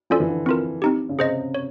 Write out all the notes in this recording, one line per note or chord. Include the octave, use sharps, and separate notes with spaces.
F3 C#4 F4 A4 D5
E3
D3
C4 F4 A#4
C4 D#4 G4
C#3
C3 G#4 C5 D#5
C#5